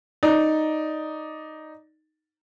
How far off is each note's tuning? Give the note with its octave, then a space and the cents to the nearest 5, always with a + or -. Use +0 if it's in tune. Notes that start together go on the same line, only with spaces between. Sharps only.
D#4 +0 D5 +0